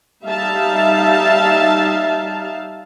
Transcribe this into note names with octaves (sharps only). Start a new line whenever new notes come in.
G3 D#4 E5 F5 A5